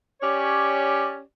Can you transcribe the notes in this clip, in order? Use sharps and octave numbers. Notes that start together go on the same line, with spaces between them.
C#4 G4 C#5 D5